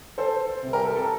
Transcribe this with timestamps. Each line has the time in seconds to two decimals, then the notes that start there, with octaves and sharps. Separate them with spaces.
0.18 A4 C5
0.63 C3 G3
0.73 G4 A#4
0.85 A4
0.96 A4